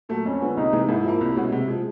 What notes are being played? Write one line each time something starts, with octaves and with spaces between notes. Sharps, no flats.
A#2 F#3 A3
F2 C#4
D3 F3 G#3 B3
C2 D#4
C3 E3 G#3
G#2 E4
F3 A#3
C2
B2 G#3 C#4 F#4
C3
F3 G#3